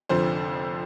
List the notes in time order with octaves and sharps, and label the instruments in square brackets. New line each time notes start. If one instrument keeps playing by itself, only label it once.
[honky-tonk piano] F1 F2 D3 F3 C5